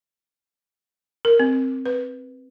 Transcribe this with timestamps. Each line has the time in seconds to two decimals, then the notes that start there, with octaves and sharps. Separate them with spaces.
1.25 A#4
1.40 C4
1.86 B4